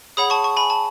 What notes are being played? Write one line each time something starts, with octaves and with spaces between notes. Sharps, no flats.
G#4 C#5 F#5 B5 D#6
A5 C#6
A5 C#6
G#5 B5
A5